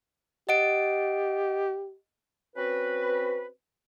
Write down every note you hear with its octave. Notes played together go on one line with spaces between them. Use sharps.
G4 D#5 F#5 D7
C4 C#4 F#4 B4